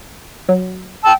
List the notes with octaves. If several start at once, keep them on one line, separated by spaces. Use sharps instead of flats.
F#3
G5 A5 E6